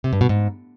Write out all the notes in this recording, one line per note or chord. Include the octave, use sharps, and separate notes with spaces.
C3
G2
B2
G#2